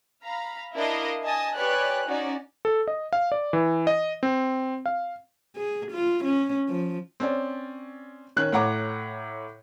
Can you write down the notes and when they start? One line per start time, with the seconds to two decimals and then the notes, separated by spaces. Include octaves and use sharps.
0.23 F5 A#5 B5
0.75 D4 E4 A#4 D#5 F5
1.23 D#5 G#5 A5 D#6
1.56 G4 B4 C#5 D5 G#5 F#6
2.07 C#4 D#4 F#4 D5
2.65 A4
2.88 D#5
3.13 F5
3.32 D5
3.53 E3
3.87 D#5
4.23 C4
4.86 F5
5.56 G#4
5.92 F4
6.24 C#4
6.68 F3
7.20 C4 C#4 D5
8.36 D#3 C#4 F#6
8.52 A2 C#5 F#5 A#5 D6